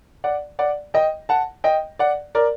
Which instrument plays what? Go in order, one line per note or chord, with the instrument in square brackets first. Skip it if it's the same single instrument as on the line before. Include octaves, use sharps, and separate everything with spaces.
[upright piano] D5 F#5
D5 F#5
D#5 G5
F#5 A5
D#5 G5
D5 F#5
A#4 D5